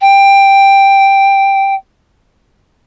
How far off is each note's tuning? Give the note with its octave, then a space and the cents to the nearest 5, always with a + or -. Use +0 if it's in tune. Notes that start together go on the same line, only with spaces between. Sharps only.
G5 +5